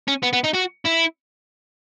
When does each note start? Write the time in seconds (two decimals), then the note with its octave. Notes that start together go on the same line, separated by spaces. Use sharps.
0.08 C#4
0.23 B3
0.34 B3
0.45 D#4
0.54 F#4
0.86 E4